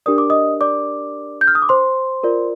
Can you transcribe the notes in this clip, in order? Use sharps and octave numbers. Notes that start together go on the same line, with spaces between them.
D4 G4 A#4 D5 D#6
D6
D#5 D#6
D5 D6
G6
F6
D#6
D6
C5 C6
F4 A#4 D5